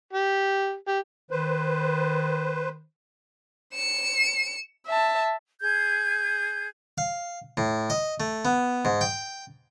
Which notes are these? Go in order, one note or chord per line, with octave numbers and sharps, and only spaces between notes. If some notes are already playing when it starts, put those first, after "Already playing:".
G4
G4
D#3 B4 C5
C#7 E7
E5 A5
G#4 G6 G#6
F5
A2
D#5
A3
B3
G#2
G5